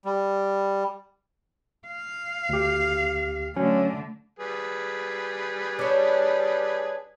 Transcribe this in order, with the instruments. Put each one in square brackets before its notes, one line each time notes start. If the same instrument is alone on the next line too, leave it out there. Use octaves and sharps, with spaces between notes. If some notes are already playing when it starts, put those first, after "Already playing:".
[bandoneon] G3
[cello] F5
[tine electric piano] D2 G4
[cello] D3 A3 [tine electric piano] F#3 C#4
[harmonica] G3 G#4 B4
[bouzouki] D4 C#5